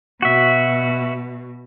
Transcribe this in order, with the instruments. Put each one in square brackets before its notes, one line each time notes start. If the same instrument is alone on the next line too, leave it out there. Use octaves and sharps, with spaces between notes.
[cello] B2 [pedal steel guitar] F#4 E5